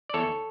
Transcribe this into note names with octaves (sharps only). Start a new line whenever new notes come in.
D5
E2 A4 C#5